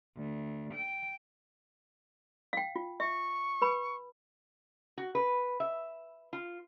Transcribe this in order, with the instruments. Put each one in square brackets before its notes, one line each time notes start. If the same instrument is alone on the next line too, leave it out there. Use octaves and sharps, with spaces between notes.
[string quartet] D2
G5
[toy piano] F5 G5
F4
[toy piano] E5 [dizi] C#6
[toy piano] B4 B5
[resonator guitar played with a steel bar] F#4
B4
E5
F4